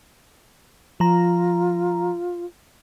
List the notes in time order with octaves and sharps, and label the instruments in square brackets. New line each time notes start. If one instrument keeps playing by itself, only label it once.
[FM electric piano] F3 A#5 [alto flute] F4